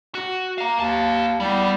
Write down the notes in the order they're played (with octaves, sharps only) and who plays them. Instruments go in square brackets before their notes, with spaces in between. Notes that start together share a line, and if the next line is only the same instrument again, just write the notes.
[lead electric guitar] F#4
F5 A#5
[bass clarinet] D#2 [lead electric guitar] G4 A5
[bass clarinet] G3 [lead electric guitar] B3 E4